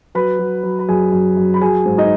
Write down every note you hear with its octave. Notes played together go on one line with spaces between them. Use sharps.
F#3 B4 B5
F#3
F#3
B5
F#2 G#4 G#5
F#2
F#2
B5
F#3 G#4 G#5
G#2
D#4 D#5